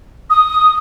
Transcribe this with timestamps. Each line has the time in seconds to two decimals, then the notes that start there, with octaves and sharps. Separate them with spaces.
0.30 D#6